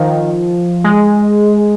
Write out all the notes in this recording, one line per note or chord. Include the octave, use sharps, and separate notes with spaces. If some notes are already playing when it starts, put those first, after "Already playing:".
Already playing: D#3 F3
G#3